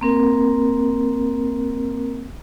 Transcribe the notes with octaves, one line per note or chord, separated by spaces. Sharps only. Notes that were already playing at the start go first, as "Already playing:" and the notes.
A#3 C4 A#4